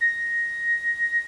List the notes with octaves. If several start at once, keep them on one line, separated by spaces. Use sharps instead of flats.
A#6